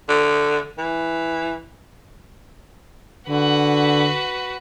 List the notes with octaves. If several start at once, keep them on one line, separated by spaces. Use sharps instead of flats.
D3
E3
D3 F#4 B4